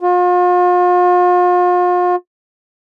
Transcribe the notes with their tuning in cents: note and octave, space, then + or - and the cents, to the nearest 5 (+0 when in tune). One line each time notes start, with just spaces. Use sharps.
F4 +40